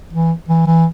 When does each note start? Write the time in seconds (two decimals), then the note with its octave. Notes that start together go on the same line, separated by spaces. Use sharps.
0.13 E3
0.48 E3
0.67 E3